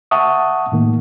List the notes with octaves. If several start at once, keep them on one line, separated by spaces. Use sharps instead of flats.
E5 F#5 A5 C#6 D#6
A2 D#3 A#3